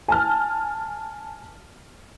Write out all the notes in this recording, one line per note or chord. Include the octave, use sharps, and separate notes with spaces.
G#5 A5 F6